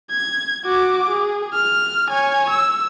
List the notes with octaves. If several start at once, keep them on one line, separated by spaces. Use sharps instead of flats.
G#6
F#4 D6
G#4
F6
C#5 G#5
E6